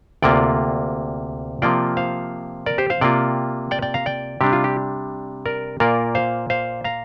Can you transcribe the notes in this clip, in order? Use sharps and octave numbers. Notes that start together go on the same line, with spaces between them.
D2 C3 A#3 F4 D5 G5
C3 F3 A#3 F4 D5 G5
C5 F5
A#4 D5
G4 C5
C5 F5
C3 A#3 F4 D5 G5
D5 G5
D5 G5
F5 A#5
D5 G5
C3 G3 D4 G4
F4
G4
A#4 D5
A#2 A#3 F4 A#4 D5
C5 F5
C5 F5
F5 A#5